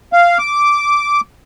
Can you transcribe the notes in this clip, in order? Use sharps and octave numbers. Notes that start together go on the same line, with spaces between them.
F5
D6